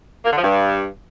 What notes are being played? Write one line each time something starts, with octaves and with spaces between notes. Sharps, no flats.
A#3
D3
F3
G2